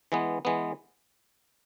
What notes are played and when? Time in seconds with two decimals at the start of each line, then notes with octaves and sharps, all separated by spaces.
0.12 E3 G#3 B3
0.45 E3 G#3 B3